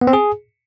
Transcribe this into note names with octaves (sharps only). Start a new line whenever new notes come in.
B3
C4
G#4